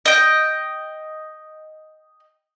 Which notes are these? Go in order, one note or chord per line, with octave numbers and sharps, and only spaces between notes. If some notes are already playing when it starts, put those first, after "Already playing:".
D#5 G5